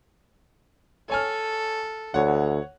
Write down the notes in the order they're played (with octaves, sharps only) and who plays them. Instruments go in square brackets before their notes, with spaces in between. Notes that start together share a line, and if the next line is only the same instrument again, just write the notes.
[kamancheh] A4 [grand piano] C#5 G#5 F6
[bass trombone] D2 [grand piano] C#5 F#5